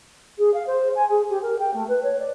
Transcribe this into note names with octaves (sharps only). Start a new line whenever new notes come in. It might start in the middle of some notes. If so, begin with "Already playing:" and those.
G#4
F5
C5
G#5
G#4
G4
A#4
G5
A3
B4
C#5
D5